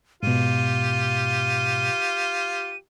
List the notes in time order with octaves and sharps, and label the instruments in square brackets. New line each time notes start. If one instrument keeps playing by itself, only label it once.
[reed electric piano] G#2 B2 [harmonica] F4 G4 [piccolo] D#7